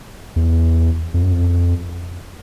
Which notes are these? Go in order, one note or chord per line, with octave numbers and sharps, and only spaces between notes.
E2
F2
F#2
F2